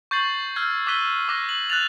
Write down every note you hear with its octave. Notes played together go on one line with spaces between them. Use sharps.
C#6 G6 A6 C7 F#7
E6 F6 G6 G#6 C7
D6 E6 F#6 B6 D#7 G7
C#6 D6 F#6 A#6 G7
F#7
F#6 A6 F7